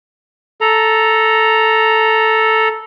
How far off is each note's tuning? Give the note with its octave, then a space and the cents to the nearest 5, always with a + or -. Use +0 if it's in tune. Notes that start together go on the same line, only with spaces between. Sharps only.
A4 +0 A#5 +0